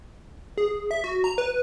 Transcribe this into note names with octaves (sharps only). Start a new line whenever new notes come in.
G#4
E5
F#4
A#5
B4